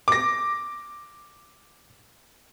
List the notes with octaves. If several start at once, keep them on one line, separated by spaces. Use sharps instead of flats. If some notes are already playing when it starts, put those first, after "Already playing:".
D6 A#6